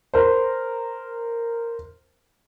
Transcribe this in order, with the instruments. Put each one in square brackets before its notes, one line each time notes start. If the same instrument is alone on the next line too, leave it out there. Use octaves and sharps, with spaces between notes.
[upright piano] A#4 C5